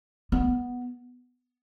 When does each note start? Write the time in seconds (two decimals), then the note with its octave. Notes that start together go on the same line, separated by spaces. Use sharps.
0.32 B3